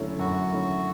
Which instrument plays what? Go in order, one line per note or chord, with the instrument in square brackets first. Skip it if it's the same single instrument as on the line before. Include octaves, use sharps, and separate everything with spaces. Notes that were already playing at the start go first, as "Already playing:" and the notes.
Already playing: [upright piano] F#2 D3 A3 C#4 E4
[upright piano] F#2 [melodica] F#4
[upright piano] D3 A3 C#4 E4